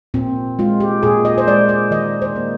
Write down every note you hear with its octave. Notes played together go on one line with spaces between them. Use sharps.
A#2 C4
G#3 F4
G4
A#2 G#4
D#5
C5
G#3 D5
D5
D#3 D#5
C5
A#3